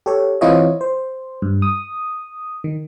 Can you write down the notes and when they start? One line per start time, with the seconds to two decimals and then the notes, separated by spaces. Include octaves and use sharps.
0.06 G4 A4 C#5
0.41 E3 C4 E4 F4 C#5 D#5
0.81 C5
1.42 G2
1.62 D#6
2.64 D#3